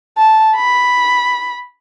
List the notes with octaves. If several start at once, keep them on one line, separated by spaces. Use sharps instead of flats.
A5
B5